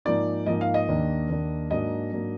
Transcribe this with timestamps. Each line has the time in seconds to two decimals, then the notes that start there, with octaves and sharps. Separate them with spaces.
0.05 G#2 F3 A#3 D#4 D5
0.46 G#2 F3 A#3 D#4 D#5
0.61 F5
0.74 D#5
0.88 D#2 D#3 A#3 D4
1.29 D#2 D#3 A#3 D4
1.71 G#2 F#3 A#3 D4 D#5
2.13 G#2 F#3 A#3 D4